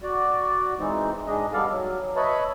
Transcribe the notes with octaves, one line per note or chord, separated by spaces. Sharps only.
F#4 D5
E3 G#3 C4 D#4
G#2 G#3 D4 D#5
G3 B3 A4 D5 F5
F#3
B4 C#5 D#5 E5 A5 B5